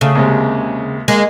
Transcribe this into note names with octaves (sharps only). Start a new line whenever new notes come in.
C#3 A3 G#4 F5
D#2 C3 G#3
G#3 A#3